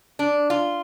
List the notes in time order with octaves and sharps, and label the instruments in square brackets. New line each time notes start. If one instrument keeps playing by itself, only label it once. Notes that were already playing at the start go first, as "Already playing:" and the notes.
[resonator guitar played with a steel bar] D4
F4